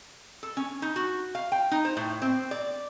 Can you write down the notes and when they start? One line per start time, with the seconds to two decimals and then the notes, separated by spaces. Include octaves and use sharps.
0.43 A4
0.57 C#4
0.82 D#4
0.96 F#4
1.35 F5
1.52 G5
1.71 D#4
1.85 C5
1.97 A2
2.22 C4
2.51 D5